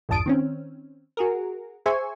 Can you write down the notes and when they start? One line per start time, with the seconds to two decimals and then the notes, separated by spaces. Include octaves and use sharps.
0.09 A#1 E2 G2 A5 D#6 D7
0.26 D#3 C4 C#4
1.17 F#4 G#4 A#4
1.86 G#4 C5 E5 G#5 C#6